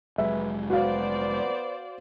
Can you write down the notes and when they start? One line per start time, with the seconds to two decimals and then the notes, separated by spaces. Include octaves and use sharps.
0.18 F1 F#3 G#3 B4 E5
0.70 B3 F#4 C5 D5 F5